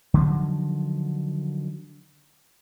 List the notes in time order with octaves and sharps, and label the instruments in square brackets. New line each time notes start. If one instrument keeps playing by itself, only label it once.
[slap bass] D3 D#3 F3 F#3